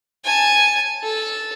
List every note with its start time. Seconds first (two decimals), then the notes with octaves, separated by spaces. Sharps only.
0.25 G#5 A5
1.04 A4